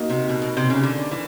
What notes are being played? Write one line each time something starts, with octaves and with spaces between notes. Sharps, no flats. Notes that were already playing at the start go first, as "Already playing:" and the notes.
Already playing: A#3 D#4 F#4
C3
B2
B2
C3
C#3
D3
E3